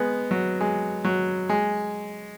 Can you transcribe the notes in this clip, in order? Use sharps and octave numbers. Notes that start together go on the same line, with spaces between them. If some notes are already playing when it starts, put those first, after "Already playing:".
Already playing: G#3 B3
F#3
G#3
F#3
G#3